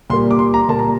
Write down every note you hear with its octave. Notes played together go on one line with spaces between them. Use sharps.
A#2 G3 A#3 C6
D6
C6
A#5
A#2 G3 A#3 A5
A#5